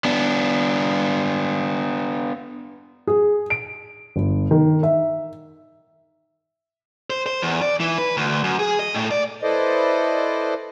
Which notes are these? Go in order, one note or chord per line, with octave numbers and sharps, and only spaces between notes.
B3 D4
G#4
D7
G1
D#3
E5
C5
C5
E2
D5
E3
B4
D2
F#2
G#4
D#5
A2
D5
E4 A4 B4 C5 D5 D#5